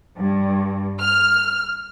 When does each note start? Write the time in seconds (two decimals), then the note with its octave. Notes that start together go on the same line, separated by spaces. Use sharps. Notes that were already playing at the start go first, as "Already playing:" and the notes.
0.16 G2
0.99 F6